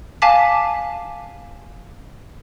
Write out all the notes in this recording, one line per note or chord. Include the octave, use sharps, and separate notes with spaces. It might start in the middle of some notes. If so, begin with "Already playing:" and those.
F5 G#5 A5 D6 B6